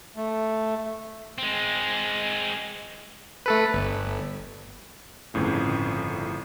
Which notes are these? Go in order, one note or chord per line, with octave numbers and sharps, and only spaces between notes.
A3
G#3 C4
A3 A4 B4
G1
G1 F2 A2 C#3